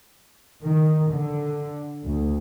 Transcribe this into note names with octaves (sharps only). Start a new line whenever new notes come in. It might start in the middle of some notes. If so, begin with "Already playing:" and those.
D#3
D3
D2